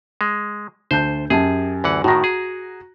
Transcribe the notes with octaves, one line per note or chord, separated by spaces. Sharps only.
G#3
D2 C5 A5 G6
F#2 G4 G#4 A5
D2 E3 F#5
A2 D#3 F#4 A#5 A#6
G#4